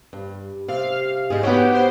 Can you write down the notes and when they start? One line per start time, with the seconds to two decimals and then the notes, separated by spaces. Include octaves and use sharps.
0.13 G2
0.68 C3 F5
1.30 G#2 G#4 D#5
1.43 B3 F#4 G4 C#5 F#5
1.74 C5